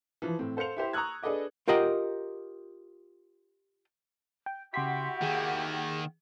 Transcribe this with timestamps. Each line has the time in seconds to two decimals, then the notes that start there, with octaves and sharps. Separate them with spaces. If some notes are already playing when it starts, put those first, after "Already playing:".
0.22 E3 F3
0.39 A2 C4
0.57 A4 C5 F5 C#7 F7
0.77 E4 G4 C5 E5
0.93 A#5 C#6 D#6 E6 F#6 G#6
1.23 D4 G#4 A4 B4 D#5 D6
1.68 F4 G4 A#4 D#5 F#5 G5
4.46 G5
4.74 C#3 E4 F#4 G4 F#5 G5 C6 B6
5.22 D#3 A#3 G#4